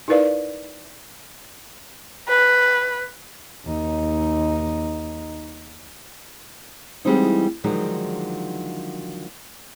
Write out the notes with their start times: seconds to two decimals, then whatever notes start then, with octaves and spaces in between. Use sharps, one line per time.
0.08 D#4 E4 A#4 B4 D5 F5
2.29 B4
3.65 D#2 D#4
7.05 E3 G3 G#3 B3 C4 D#4
7.64 D3 D#3 F3 F#3 G#3 D#4